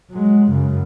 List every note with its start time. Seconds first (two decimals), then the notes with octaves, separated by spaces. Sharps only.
0.11 F#3 G#3
0.49 F#2 C#3